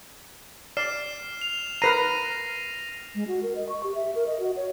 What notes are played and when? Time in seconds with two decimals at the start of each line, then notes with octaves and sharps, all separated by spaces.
0.77 D5 F6 C7 E7
1.41 F7
1.82 A#4 B4 A#5 A#6 C7 D#7
3.15 G#3
3.28 F#4
3.43 A#4
3.55 D#5
3.69 C#6
3.83 G4
3.95 E5
4.15 A#4
4.27 D#5
4.40 F#4
4.56 C#5